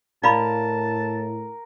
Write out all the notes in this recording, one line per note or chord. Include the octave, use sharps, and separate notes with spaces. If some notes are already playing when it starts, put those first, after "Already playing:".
A2 A#4 D5 F5 A5 B5